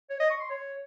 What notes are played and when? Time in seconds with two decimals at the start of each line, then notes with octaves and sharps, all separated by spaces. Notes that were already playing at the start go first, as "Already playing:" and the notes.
0.10 C#5
0.20 D#5
0.30 C#6
0.40 C6
0.50 C#5